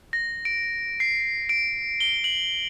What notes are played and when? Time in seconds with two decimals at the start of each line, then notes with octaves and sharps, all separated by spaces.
0.13 A#6
0.45 D7
1.00 C7
1.49 D7
2.00 G7
2.24 F#7